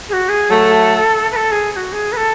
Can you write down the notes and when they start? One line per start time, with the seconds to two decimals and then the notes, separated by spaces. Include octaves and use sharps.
0.09 G#4
0.13 F#4
0.29 G#4
0.50 F#3 A3 A4
1.31 B4
1.36 A4
1.51 G#4
1.72 G#4
1.76 F#4
1.92 G#4
2.12 B4
2.17 A4